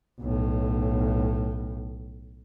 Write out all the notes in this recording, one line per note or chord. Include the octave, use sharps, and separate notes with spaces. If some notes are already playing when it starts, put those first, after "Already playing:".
B1 A2